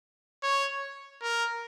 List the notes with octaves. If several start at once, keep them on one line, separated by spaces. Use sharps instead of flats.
C#5
A#4